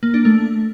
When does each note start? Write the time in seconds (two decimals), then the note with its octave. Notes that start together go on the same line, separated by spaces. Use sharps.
0.03 A#3
0.14 D4
0.25 A3